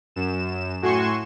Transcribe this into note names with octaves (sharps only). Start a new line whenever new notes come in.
F#2 E7
A2 F#4 G#5 C6 C#6 E7